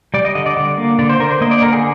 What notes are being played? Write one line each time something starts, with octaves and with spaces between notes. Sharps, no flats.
G3 D5
D#5
D3 D#5
D5
D3
A#3
D3 D5
C5
D3 A#4
C5
A#3 D#5
D5
D3 A#4
G#4